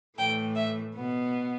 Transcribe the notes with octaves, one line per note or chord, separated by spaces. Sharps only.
A2 E3 A3 G5
E5
B2 B3